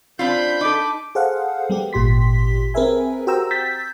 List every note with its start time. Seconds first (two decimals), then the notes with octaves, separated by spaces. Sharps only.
0.19 C4 D4 F4 B5 G6
0.61 D#4 A4 D6
1.15 G#4 A4 C5 F5 F#5
1.70 G3 B3 G4
1.93 G#1 A#2 G4 C6 B6
2.74 C4 G#4 A#4 B4 E5 G#5
3.27 F#4 G4 C5 G5 A#5 E6
3.51 E6 G6 A6 B6